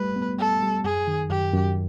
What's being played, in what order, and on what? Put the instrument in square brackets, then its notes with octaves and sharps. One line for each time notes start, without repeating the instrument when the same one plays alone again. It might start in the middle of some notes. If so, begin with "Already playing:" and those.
Already playing: [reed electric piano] G3 A3 [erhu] B4
[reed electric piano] B3
[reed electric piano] G3 [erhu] A4
[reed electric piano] G3
[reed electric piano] F#2 [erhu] G#4
[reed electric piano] D#3
[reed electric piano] F#2 [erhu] G4
[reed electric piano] F#2